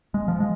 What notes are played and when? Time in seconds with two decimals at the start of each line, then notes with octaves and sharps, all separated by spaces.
0.14 G#3
0.28 F3
0.40 G#3